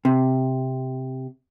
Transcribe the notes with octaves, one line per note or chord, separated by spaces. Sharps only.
C3